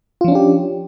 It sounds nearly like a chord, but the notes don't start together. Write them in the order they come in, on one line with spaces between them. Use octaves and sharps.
F4 F3 C#4 D4 G4